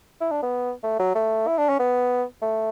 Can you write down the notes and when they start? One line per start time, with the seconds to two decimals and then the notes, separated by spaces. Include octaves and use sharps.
0.21 E4
0.31 D4
0.42 B3
0.84 A3
0.99 F#3
1.15 A3
1.47 E4
1.58 D4
1.69 C#4
1.79 B3
2.42 A3